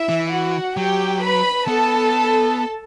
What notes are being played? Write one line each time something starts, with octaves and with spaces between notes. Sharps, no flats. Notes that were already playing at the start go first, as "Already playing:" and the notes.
Already playing: E4 E5
E3
F#4 F#5
F#3 G4 G5
B4 B5
B3 A4 A5